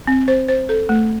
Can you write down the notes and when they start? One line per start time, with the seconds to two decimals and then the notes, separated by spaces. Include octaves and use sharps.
0.07 C4
0.28 C5
0.48 C5
0.69 A4
0.89 A3